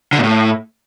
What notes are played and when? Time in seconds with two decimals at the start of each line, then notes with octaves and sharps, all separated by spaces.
0.13 D3
0.18 A#2
0.23 A2